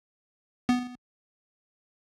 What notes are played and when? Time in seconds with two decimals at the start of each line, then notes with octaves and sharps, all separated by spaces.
0.69 B3